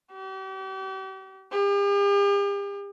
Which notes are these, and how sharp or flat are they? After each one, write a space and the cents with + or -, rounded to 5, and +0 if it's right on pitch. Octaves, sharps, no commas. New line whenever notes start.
G4 -40
G4 +45